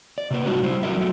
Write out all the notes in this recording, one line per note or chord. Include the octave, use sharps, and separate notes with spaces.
D5
C3 A#3 B4
G3 G#3 D4 D#4 F4 F#4
G3 E4 C5
F#3 G3 E4 A#4 D5 E5
F#3 G3 A3